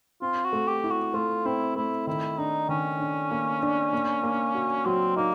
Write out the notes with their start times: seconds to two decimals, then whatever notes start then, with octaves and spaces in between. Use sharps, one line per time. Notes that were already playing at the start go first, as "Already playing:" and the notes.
0.21 C4 F4
0.44 F#4
0.53 A3
0.68 G4
0.84 E4
0.91 F#4
1.14 A3 F4
1.45 C4 E4
1.76 A3 E4
2.07 D#3 E4
2.38 D4 D#4
2.69 D#3 C#4
3.00 D4
3.31 A#3
3.63 D4
3.93 A#3
4.23 A#3
4.55 F#4
4.85 F#3 C4
5.16 A#3 D#4